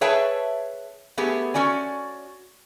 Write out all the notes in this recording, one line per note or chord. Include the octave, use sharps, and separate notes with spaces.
G#4 B4 C#5 E5 G5 A5
A3 B3 G4 G#4
C#4 F#4 D5 G#5